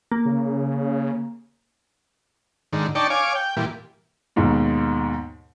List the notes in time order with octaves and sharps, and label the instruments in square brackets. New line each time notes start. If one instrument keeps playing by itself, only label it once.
[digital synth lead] A#3
[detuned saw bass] C#3
[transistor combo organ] G#2 D3 D#3
D4 D#4 D5 G5 A5 C#6
C#5 F5 G#5 D6
G5
A#2 E3 G3
[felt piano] D#2 G#2 B2